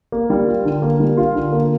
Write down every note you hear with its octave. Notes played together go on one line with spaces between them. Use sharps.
A#3
G3
F4
D3
A#3
G3
F4
D3
A#3